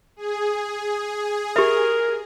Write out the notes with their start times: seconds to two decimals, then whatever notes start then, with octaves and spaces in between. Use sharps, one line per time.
0.17 G#4
1.56 G4 A#4 E5